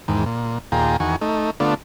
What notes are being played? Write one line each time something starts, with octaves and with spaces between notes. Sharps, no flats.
E2 G#2 D#3
A#2
D#2 A#2 F4 G#4 G5 A#5
E2 D#3 F#4 G#5 C#6
A3 D#4
D3 A3 B3 D4 F4